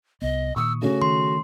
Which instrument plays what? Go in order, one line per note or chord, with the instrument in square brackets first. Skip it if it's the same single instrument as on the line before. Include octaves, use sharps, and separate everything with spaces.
[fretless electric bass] C2 B3 [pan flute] D#5
[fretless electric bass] A#2 D#3 [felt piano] C#6 D#6 C#7 [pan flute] E6
[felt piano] C#3 A3 C#4 [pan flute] F#4
[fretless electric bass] D#3 [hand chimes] C6